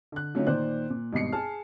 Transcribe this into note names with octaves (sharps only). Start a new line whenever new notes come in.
D3 F#6
D3 F#3 A3 C#4 D#4 F4
A#2 D#3 C5 D5 F#6
A#2
G#1 G2 B2 D#5 C7 C#7
G#4 A5 F6